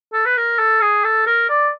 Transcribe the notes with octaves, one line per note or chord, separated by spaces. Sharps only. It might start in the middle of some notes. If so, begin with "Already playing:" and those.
A4
B4
A#4
A4
G#4
A4
A#4
D5